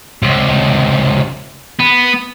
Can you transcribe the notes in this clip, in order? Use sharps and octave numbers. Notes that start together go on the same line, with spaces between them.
C#2 C3
B3